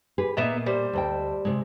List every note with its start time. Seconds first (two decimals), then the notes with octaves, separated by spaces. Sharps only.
0.18 G4 G#4 B4
0.37 A#2 A#3 B3 D#5 E5 A#5
0.66 G3 C5
0.93 D2 D#5 G5
1.45 C3 G#3